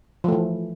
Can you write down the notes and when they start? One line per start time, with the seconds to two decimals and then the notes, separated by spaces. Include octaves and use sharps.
0.24 F3
0.28 A3
0.32 E3